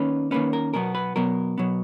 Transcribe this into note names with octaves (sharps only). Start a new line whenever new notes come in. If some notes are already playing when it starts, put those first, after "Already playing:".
Already playing: D#3 A#3 C#4 B4
D#3 A#3 C#4 B4
A#4
B2 F#3 B3 A#4
B4
B2 F#3 B3 A#4
B2 F#3 B3